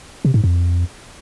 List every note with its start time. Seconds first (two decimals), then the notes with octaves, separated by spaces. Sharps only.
0.25 C3
0.34 G#2
0.44 F2